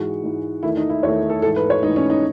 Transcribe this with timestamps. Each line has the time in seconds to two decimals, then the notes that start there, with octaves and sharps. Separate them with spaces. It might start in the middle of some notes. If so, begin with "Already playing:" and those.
Already playing: G#2 E3 G#3 F#4
0.24 G#2 E3 G#3
0.63 E2 D#3 A3 E4
0.77 D#4
0.90 E4
1.03 E2 D#3 A3 C#5
1.30 A4
1.42 G#2 E3 A3 A4
1.56 B4
1.70 C#5
1.82 G#2 E3 A3 D#4
1.96 C#4
2.10 D#4